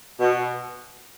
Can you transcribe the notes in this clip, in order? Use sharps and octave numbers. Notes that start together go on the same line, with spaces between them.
B2